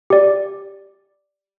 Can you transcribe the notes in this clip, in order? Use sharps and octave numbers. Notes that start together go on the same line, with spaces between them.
G4 D5